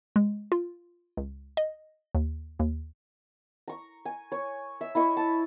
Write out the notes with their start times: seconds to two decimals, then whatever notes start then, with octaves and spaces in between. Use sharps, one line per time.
0.16 G#3
0.52 F4
1.17 C#2
1.57 D#5
2.15 D#2
2.59 D#2
3.68 A#5 C#6
4.05 G#5
4.32 C#5
4.81 E5
4.95 E4 D#5 C#6
5.17 A5